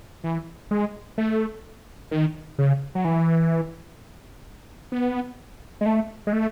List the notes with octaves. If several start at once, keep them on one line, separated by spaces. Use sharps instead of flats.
E3
G#3
A3
D#3
C#3
F#3
E3
B3
G#3
A3
G#3
A3